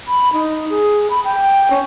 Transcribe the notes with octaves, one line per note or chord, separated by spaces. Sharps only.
B5
D#4
G#4
B5
G5
C#4